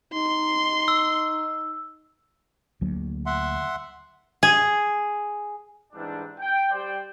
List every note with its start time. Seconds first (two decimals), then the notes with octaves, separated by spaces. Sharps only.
0.13 D#4 C6
0.88 E6
2.81 D2 F#3 A#3
3.26 E5 F#5 C6
4.43 G#4
5.93 G#2 E3 G3 C4 D4
6.39 G5
6.71 G3 C5 D5 G5